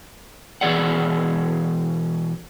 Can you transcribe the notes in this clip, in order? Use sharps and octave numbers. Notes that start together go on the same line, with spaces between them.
B2 E3 G#4 D5 F#5